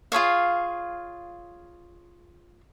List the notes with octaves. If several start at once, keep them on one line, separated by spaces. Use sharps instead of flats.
F4 G#4 C#5 F5